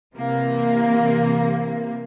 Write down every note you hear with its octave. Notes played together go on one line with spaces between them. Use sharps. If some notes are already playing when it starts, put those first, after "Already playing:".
C3 E3 A#3